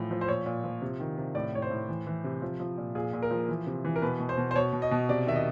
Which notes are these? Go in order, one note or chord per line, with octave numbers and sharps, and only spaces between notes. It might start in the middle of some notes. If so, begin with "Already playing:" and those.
Already playing: A2 E3 F3
F3
C5
A#2 C#5
A#2
F3
C3
D#3
C3
A2 D5
A2 C#5
C5
A2
E3
E3
C3
F3
F3
A#2
A#2 G#4
A#2
A#4
F3
E3
C3
E3
A#4
B2 B4
B2
C5
B2
C5
B2 C#5
B2
D#5
B2
C3 D5
D#3 E5
D#5